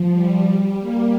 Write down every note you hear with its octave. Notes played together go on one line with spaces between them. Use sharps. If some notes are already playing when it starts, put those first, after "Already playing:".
Already playing: F3
G3
G3
A#3